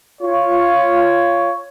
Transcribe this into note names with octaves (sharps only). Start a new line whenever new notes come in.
F4 C#5